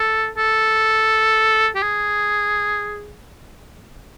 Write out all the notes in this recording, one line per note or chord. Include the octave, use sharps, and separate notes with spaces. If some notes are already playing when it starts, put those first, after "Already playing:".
Already playing: A4
A4
G4
G#4